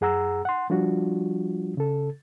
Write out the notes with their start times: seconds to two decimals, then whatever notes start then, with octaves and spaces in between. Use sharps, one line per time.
0.01 F#2 G#4 F#5 A#5 E6
0.45 F#5 C6
0.70 F3 G3 D4 F4 F#4
1.77 C#3 A4